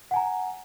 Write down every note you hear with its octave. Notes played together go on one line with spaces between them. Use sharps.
F#5 G#5 A#5